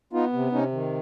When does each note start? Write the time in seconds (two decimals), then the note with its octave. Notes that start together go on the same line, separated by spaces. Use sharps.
0.13 B3 D#4 F4
0.33 C3
0.52 C3 C#4 D#4
0.72 D#3